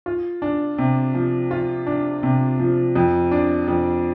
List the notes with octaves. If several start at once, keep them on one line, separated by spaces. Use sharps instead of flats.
F4
D4
C3
F3
F4
D4
C3
F3
F2
D4
F2